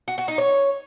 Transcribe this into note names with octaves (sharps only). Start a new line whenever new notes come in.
F#4
F#4
D#4
C#5